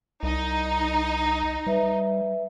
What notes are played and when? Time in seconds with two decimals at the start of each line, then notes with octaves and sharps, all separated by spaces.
0.23 C2 D#4
1.66 G3 B4 E5